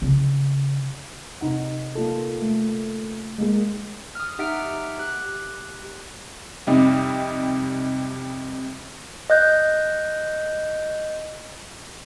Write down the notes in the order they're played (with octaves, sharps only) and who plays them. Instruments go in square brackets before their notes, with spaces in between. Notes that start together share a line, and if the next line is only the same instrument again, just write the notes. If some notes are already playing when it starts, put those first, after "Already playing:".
[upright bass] C#3
[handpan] C3 D#4 F#5
A#3 F4 A4
A3
G#3 A#3 G#4
[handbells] D#6 F6
D#4 G4 E5 F#5 F6 D7
G4 F#6
[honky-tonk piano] F2 C3 G3 D#4
[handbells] D#5 F#6 G6